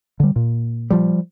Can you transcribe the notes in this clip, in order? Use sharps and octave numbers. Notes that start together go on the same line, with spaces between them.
D3 G3
A#2
F3 G3